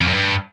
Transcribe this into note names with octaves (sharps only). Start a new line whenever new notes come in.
F2
F#2
G2